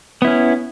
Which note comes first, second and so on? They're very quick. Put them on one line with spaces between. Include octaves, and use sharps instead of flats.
B3 E4 C#4